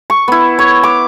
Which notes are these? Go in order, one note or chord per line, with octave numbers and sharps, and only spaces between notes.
C#6
B3 E4
C#5
D6